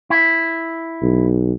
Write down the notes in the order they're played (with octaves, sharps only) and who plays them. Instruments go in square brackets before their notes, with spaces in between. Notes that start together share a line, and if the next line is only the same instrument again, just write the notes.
[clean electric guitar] E4
[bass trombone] B1